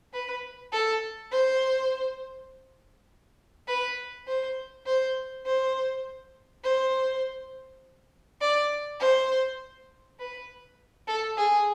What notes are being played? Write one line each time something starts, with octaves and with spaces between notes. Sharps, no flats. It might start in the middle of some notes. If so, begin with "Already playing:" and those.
B4
A4
C5
B4
C5
C5
C5
C5
D5
C5
B4
A4
G#4